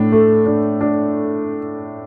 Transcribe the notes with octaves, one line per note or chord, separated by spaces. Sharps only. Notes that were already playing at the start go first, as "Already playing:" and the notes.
Already playing: A2 A3 D4
A3
D4
D4